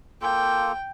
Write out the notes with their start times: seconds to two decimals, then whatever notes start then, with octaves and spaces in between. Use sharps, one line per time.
0.22 A#3 F4 A4 G5